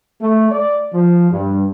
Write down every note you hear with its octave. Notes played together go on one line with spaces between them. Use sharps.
A3
D5
F3
G2